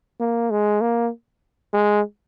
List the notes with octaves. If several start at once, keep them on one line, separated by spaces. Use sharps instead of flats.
A#3
G#3
A#3
G#3